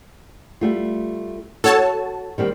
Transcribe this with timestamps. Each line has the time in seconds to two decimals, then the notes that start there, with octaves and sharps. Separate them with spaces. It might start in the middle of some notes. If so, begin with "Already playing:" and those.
0.61 G3 A3 F4
1.64 F#4 A4 C#5 A5
2.38 D#3 G3 C4